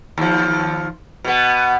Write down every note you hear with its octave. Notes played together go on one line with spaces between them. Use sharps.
D#2 F3
B2 B3